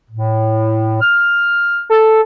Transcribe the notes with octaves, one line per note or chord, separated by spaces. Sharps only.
A2
F6
A4